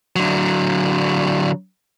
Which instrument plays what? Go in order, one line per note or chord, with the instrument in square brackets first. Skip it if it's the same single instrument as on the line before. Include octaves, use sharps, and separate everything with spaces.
[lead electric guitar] D3 F#3